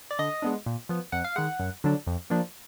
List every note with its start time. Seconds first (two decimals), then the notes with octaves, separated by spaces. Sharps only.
0.11 D5
0.19 D3 D#5
0.42 G#3 B3 D4
0.66 A#2
0.89 F3 B3
1.12 F2 F#5
1.24 F5
1.36 D#3 G#3 F#5
1.60 F#2
1.84 D3 F#3 D4
2.07 F2
2.30 F3 A#3 D4